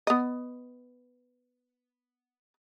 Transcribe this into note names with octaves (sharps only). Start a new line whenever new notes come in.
B3 D#5